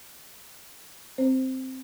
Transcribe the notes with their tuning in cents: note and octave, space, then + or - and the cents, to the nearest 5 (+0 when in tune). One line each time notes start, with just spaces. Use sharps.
C4 +0 C5 +0